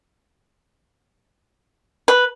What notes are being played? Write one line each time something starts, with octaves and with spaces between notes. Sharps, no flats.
B4